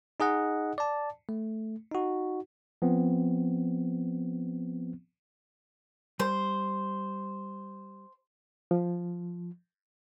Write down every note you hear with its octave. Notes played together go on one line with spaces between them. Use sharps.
D#4 G#4 D#5 F#5
D5 A5
A3
D#4 F#4
F3 B3 C4
G3 C5
F3